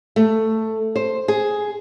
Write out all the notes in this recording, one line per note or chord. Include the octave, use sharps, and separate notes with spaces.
A3
C5
G#4